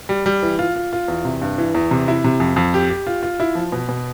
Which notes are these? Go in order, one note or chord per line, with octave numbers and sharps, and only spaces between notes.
G3
G3
E3
F4
F4
F4
E2
C3
G2
E3
E2
C3
E4
C3
F2
F2
G4
G4
F4
F4
E4
F3
B2
B2